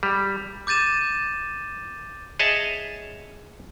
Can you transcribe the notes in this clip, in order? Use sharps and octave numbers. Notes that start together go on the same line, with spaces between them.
G3
D6 G6 A6 D#7 E7
G#4 C#5 D#5 E5 A5